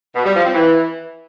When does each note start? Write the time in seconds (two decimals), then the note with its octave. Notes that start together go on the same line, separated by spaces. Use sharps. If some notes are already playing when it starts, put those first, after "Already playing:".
0.16 B2
0.25 G3
0.35 F3
0.44 C4
0.54 E3